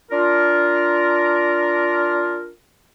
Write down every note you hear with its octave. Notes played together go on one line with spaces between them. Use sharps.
D4 F4 A#4